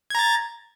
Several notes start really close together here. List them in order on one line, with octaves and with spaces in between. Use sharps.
G#6 A#5 A6